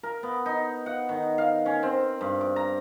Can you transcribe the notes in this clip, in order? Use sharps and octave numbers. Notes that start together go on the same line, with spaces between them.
A#4
B3
D#4
F#5
D#3
F5
C#4
C4
G2
D6
A#5